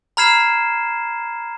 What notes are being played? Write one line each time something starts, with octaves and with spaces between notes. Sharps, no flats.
A#5 B5 F6 G#6 C7 E7